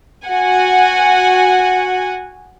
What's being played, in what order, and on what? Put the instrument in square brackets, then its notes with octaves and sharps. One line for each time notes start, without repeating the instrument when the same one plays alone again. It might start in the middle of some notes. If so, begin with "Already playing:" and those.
[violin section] F#4 F#5 G#5